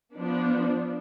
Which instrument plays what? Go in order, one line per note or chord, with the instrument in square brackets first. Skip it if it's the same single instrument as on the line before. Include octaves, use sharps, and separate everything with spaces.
[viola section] F3 B3 D4